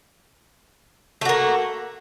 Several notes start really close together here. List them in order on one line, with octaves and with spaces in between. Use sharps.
A3 F#4 A#3